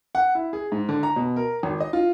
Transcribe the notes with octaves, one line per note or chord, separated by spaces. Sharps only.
F#5
E4
G#4
G#2
D3
A#5
B2
A#4
G#1
D#5
F4